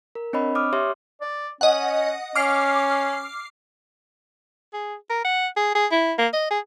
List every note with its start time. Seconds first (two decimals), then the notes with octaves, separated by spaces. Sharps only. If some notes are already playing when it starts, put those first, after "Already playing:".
0.15 A#4
0.33 C4 D4 C#5 D#5 B5
0.55 D6 D#6 F6
0.73 G4 C#5 E5 C6
1.21 D5
1.61 C#4 D#5 F#5
2.36 C#4 D6 F6 C7
4.73 G#4
5.10 A#4
5.24 F#5
5.57 G#4
5.75 G#4
5.91 E4
6.18 A#3
6.33 D#5
6.50 G#4